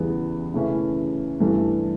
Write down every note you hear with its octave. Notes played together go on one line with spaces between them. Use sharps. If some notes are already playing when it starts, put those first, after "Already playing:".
Already playing: E2 C#3 E3 G3 B3
C#3 E3 A3 C#4 E4
G2 E3 A3